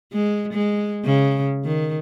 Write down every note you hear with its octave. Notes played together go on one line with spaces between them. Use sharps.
G#3
G#3
C#3
D#3